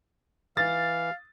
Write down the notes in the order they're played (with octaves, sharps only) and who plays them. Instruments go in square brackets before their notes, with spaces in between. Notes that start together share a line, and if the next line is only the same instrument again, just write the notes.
[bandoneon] E3 [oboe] F5 [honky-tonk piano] A6